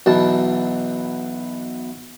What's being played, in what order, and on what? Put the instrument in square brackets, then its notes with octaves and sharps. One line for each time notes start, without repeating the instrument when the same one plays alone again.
[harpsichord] B1 B2 E3 A5